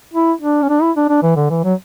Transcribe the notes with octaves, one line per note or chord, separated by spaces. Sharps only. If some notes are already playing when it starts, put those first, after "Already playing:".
E4
D4
C#4
D4
E4
D4
D4
E3
D3
E3
F#3